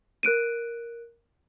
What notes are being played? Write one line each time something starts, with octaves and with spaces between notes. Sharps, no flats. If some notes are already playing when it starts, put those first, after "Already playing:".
A#4 F#6 D7 D#7